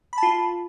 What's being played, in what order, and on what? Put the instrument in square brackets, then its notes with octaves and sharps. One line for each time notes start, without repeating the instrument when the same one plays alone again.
[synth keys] B5
A5
F4